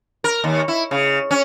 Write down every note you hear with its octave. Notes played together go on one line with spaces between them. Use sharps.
A#4
D#2
E4
C#3
C#4